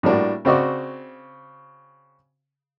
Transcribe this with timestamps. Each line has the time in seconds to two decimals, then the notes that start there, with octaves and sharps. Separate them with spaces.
0.03 A2 G3 A#3 D4 F#4
0.45 C#3 C4 F#4 D5 D#5 C#6